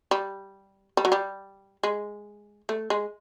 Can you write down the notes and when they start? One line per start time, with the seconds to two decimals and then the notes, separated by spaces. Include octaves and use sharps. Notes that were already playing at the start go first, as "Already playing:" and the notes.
0.11 G3
0.97 G3
1.05 F#3
1.12 G3
1.83 G#3
2.69 A3
2.90 G#3